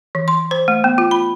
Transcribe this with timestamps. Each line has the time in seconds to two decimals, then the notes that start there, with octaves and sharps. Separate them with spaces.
0.15 E3
0.28 C6
0.51 C5
0.68 A3
0.84 B3
0.98 F4
1.11 B5